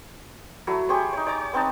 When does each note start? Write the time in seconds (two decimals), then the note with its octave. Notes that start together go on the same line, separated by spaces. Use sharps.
0.67 F#3 A3 E4
0.89 G4 G#4 C5 C#5
1.13 D#4 C#5
1.27 C#5 A#5 D6
1.53 B3 C4 D#4 A5